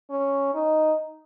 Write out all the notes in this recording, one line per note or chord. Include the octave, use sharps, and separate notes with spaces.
C#4
D#4